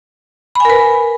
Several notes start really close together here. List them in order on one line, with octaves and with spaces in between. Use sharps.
B5 G#5 A#4 B4